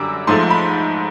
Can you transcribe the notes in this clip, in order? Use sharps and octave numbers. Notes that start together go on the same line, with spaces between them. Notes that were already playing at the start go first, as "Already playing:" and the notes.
Already playing: F#2 D3 G3 D6
G#2 F3 A3 C6
B5